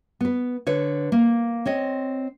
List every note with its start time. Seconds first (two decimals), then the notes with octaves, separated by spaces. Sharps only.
0.21 B3 B4
0.67 D3 B4 C#5
1.12 A#3
1.66 C4 C#5 D#5